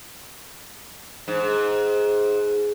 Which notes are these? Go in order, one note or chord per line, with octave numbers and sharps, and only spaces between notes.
G#2